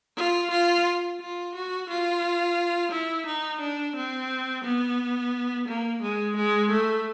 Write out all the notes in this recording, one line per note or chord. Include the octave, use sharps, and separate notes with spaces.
F4
F4
F4
F#4
F4
E4
D#4
D4
C4
B3
A#3
G#3
G#3
A3